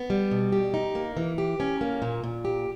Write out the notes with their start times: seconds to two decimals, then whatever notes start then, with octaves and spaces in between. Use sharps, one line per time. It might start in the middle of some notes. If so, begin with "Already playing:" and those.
Already playing: B3
0.10 G3
0.31 B2
0.52 G4
0.74 D#4
0.95 A#3
1.17 E3
1.38 G4
1.60 C#4
1.81 A#3
2.02 A#2
2.24 A#2
2.45 G4